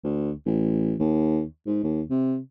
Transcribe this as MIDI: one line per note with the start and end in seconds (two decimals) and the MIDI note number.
0.04 0.32 38
0.46 0.95 33
1.00 1.44 39
1.66 1.83 44
1.84 2.02 39
2.10 2.38 48